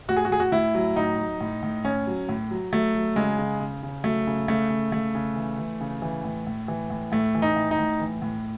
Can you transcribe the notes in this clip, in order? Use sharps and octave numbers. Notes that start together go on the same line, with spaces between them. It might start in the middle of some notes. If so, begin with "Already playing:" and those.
A2 F#4
G#4
F#4
A2 G#4
F#4
A2 E4
F#3
A2 D#4
F#3
A2
A2
A2 C#4
F#3
A2
F#3
F#3 A3
F#3
C#3 G#3
C#3
C#3
C#3
F#3 A3
C#3
C#3 A3
C#3
C#3 A3
C#3
E3
E3
C#3
E3
A2
A2
E3
A2
A2 A3
E3
D#4
A2
D#4
A2
E3
A2